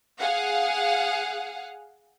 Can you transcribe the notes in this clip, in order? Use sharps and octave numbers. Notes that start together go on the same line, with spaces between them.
G#4 F5 F#5